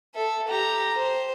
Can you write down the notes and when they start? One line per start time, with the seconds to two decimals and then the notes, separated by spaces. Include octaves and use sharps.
0.15 A4 E5
0.48 G4 A#5
0.97 C5